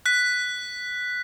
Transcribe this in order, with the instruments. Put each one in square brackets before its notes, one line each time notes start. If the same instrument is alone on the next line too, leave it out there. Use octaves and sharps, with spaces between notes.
[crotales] F#6 B6